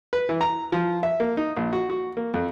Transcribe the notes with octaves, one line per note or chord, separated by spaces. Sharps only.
B4
E3
A#5
F3
E5
A#3
D#4
A#1
F#4
F#4
A#3
F2